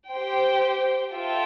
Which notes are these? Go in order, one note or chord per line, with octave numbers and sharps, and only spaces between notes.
G4 C5 G5
F4 A4 E5 G5